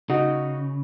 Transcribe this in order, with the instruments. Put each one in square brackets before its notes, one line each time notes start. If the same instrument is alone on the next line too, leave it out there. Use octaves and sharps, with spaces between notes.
[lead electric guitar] C#3 [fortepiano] D#4 F#4